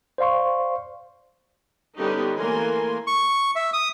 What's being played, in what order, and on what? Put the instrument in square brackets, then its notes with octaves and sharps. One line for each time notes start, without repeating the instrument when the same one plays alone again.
[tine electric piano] C5 D5 F5 C6 C#6
[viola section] D3 G3 B3 C#4 D#4 G4
E3 A3 A#3 A#4 G#5 C6
[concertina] C#6
E5
D#6